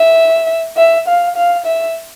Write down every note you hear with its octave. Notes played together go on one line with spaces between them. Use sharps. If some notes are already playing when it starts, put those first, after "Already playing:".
Already playing: E5
E5
F5
F5
E5